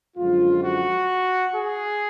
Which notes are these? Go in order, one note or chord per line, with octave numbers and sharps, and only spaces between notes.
F#2 D3 F3 G#3 F4
F#4
G#4